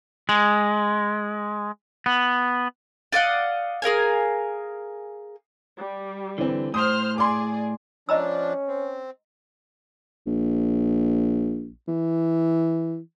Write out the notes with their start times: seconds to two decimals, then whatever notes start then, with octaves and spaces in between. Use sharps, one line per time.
0.29 G#3
2.06 B3
3.12 D5 D#5 F5 F#5
3.82 G#4 A#4 F5 G#5
5.80 G3
6.38 D3 E3 C4
6.74 A2 C5 D#6 F6
7.18 G#4 D5 C6 D6
8.09 F3 C#4 D4 D#5 A#5 E6
8.68 C4
10.26 A#1
11.88 E3